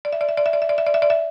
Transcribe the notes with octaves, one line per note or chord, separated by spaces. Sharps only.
D5
E5
D5
E5
D5
E5
D5
E5
D5
E5
D5
E5
D5
E5